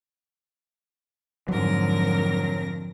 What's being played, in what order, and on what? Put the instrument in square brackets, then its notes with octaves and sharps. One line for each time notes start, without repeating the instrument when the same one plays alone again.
[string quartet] F2 A#4 A#6 [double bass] G#2 D3 [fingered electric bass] F#3